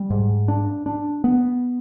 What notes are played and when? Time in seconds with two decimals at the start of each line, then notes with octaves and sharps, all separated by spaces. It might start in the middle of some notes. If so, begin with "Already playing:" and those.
Already playing: G3
0.10 G#2
0.48 D4
0.86 D4
1.24 B3